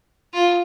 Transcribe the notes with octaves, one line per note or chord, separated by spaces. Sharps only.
F4